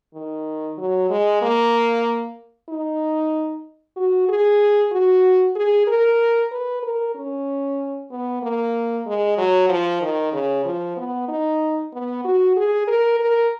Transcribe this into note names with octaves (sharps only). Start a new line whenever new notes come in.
D#3
F#3
G#3
A#3
D#4
F#4
G#4
F#4
G#4
A#4
B4
A#4
C#4
B3
A#3
G#3
F#3
F3
D#3
C#3
F3
B3
D#4
B3
F#4
G#4
A#4
A#4